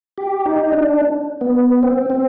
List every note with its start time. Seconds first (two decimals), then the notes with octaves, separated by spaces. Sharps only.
0.18 G4
0.46 D#4
0.72 D4
1.41 B3
1.83 C4
2.10 C4